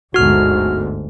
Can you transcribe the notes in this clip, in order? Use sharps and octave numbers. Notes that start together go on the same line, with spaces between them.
G1 D2 G#2 F#4 F6